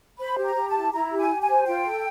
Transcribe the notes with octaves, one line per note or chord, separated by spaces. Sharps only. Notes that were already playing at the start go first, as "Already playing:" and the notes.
C5 B5
G4
A#5
G4
A5
E4
E4 A#5
G4
G#5
G4
G#5
C5
F4 G5
A4